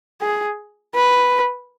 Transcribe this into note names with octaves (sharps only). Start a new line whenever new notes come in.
G#4
B4